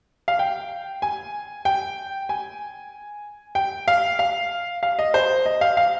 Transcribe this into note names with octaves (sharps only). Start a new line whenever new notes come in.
F5
G5
G#5
G5
G#5
G5
F5
F5
F5
D#5
C5
D#5
F5
F5